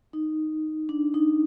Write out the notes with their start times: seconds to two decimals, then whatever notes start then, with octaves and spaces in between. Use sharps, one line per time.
0.13 D#4
0.89 D4
1.14 D#4